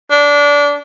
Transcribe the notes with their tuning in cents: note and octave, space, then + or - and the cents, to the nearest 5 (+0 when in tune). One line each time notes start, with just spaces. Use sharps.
D4 -20